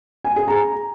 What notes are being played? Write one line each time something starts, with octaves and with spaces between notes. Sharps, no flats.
G#5
G#4
A#5